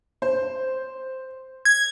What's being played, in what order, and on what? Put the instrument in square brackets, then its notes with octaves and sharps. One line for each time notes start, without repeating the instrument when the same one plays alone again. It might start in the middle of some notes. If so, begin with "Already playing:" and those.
[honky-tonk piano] C5
[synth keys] G#6